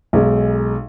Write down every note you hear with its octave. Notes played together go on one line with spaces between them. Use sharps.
B1 G#3